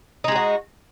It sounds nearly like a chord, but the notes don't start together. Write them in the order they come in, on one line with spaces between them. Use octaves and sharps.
D#4 G#3 G4 F#4